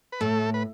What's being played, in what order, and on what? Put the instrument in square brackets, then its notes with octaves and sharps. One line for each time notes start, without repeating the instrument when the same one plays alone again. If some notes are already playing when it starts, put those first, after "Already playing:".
[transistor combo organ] B4
[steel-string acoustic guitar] A2 [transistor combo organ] A3 A4
[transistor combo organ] B4